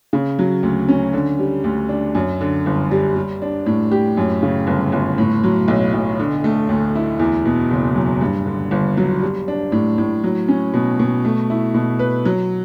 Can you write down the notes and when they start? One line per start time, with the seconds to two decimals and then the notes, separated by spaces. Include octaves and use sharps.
0.13 C#3
0.39 F#3
0.63 D2
0.89 C#4
1.13 D3
1.39 G3
1.64 D2
1.89 D4
2.15 F#2
2.41 D3
2.66 G1
2.91 G3
3.16 G3
3.42 D4
3.66 A2
3.91 G4
4.17 F#2
4.43 C#3
4.67 G1
4.92 G1
5.18 A2
5.44 F#3
5.68 B1
5.94 B1
6.20 D3
6.44 A3
6.69 D2
6.95 E4
7.20 E2
7.46 B2
7.71 F#1
7.96 F#3
8.21 G2
8.46 D3
8.71 G1
8.97 F#3
9.22 G3
9.48 D4
9.72 A2
9.98 A2
10.24 F#3
10.48 C#4
10.74 B2
11.00 B2
11.25 A3
11.50 E4
11.74 B2
11.99 B4
12.25 F#3